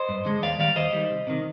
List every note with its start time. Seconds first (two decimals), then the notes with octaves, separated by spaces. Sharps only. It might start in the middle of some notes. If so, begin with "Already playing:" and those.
Already playing: C5 D#5
0.09 G2
0.25 D3 G#3
0.42 D#2 D5 F5
0.59 D#3 G3 D5 F5
0.76 D#2 C5 D#5
0.93 D#3 G3
1.10 C2
1.27 C3 D#3